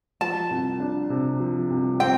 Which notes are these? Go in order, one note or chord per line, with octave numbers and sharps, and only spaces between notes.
F3 A5
C2
D4
C3
F3
C2
C4 G5